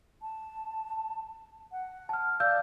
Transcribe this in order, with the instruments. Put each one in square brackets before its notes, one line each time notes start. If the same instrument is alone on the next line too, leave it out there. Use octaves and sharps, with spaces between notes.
[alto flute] A5
F#5
[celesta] A5 F6
[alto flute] D5 [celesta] F5 E6 G6